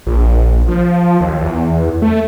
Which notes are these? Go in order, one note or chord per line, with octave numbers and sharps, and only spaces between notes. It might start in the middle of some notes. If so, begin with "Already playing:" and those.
A#1
F3
D#2
E2
A3